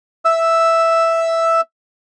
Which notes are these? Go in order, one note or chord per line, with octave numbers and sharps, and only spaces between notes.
E5 E6